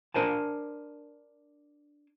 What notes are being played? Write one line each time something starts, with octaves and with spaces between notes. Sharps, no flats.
D4 A#4 C5 G#5 A5